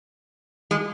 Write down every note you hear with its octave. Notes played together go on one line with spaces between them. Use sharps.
G#3